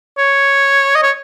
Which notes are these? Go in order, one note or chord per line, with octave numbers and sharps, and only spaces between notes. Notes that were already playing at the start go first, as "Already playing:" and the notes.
C#5
D#5
C#5